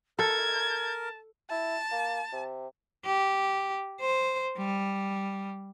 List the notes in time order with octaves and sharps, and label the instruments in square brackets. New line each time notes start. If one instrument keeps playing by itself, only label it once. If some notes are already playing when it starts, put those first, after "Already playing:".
[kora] A4 [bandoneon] A#4 [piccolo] A5 [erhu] G#6
[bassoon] E4 [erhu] A5
[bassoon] A#3
C3
[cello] G4
C5
G3